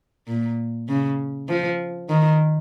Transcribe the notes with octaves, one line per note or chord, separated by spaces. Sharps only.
A#2
C#3
F3
D#3